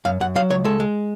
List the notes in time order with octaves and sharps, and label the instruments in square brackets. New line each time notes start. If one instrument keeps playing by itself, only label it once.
[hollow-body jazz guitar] F#2 F5
F#2 F#5
F#3 F5
C#2 C#5
G#3 A4
G#3